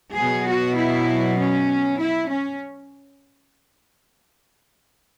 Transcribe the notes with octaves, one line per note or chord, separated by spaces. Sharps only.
B2 F#3 B3 G#4
F#4
E4
C#4
E4
C#4